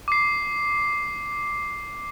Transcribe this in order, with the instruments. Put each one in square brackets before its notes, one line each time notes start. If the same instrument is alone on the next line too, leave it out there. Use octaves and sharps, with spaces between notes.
[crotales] D6 C7